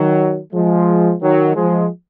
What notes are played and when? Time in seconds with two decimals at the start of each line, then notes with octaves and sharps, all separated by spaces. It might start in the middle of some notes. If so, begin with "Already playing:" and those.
Already playing: D#3 F#3
0.53 F3 G#3
1.22 D#3 F#3
1.56 F3 G#3